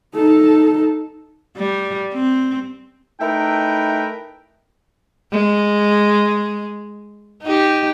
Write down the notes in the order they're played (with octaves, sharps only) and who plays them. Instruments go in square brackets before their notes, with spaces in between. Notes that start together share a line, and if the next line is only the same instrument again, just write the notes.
[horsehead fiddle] D#4 A4
[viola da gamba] G3
C4
[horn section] A3 D#4 E4 A#4 B4 G5
[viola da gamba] G#3
D#4 G4